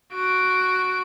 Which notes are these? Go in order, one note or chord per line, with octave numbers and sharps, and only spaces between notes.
F#4 D7